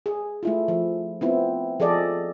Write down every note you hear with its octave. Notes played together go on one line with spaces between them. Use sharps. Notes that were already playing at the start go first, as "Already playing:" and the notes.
G#4
A3 E4 F4
F3
B3 C4 E4 F4
F3 G#4 A4 D5 D#5